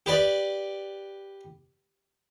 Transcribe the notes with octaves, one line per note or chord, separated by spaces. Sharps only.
G4 B4 D5